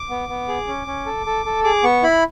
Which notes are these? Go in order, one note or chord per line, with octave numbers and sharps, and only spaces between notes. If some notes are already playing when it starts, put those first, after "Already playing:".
Already playing: D6
B3
B3
G#4
C#4
C#4
A4
A4
A4
G#4 D6
B3 C#6
E4 B5